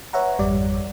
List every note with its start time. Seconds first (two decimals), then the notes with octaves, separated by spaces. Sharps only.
0.13 B4 C#5 E5 F#5 A#5
0.38 G#1 F2 G3 D5